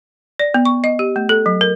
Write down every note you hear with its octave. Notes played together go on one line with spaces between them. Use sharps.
D5
B3
C#6
D#5
G4
A3
A4
F#3
A#4